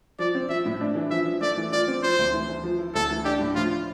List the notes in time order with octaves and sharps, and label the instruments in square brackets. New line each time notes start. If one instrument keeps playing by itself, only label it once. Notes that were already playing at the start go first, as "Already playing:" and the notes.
[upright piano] F3 [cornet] D5
[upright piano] C4
[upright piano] F3 [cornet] E5
[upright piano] A2
D4
E3
[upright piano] F3 [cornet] E5
[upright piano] F3
[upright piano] A3 [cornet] D5
[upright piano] E3
[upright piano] F4 [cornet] D5
[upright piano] C4
[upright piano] F3 [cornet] C5
[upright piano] D2
E3
E3
F3
E4
[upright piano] D2 [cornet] A4
[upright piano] E3
[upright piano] D4 [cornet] G4
[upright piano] A2
[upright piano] F3 [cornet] F4